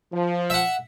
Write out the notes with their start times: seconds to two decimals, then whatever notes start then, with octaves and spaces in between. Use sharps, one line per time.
0.12 F3
0.50 E5 F#5